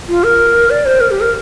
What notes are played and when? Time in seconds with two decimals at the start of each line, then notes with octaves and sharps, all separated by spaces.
0.09 F4
0.24 A#4
0.70 D5
0.85 C5
1.00 A#4
1.11 G4
1.21 A#4